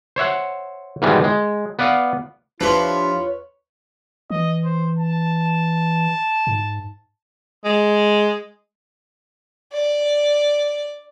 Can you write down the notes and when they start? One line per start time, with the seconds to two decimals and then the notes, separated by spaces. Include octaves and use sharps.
0.16 C5 C#5 E5 F#5
1.02 G#2 B2 D#3 E3 G3 G#3
1.24 G#3
1.79 B3 B4 D5 F5 F#5
2.61 F3 D4 E4 F4 G4 B4 C#5 C6
4.30 E3 D#5
4.65 C5
4.99 A5
6.47 G#2
7.65 G#3
9.73 D5